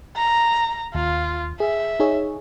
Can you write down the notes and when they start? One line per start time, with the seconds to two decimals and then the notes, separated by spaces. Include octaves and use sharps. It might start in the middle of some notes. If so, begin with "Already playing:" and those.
0.16 A#5
0.94 D#2 F4
1.60 G#4 E5
2.00 D#4 G#4 C#5